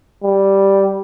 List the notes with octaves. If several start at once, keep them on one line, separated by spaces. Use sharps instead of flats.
G3